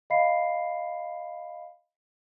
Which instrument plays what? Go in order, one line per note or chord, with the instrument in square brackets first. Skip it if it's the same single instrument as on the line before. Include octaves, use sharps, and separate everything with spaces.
[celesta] D#5 F5 B5 C7